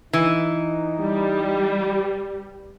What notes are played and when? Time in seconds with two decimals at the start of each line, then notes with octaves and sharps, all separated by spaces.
0.13 E3 D#4
0.99 G3